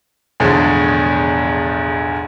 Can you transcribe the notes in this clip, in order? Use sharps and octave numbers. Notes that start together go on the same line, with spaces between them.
B1 E2 A2 D3 F3 G#3